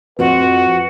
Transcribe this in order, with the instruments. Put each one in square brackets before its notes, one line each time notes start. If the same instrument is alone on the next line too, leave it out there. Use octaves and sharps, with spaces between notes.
[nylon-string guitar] F2 [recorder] F#4 [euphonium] B4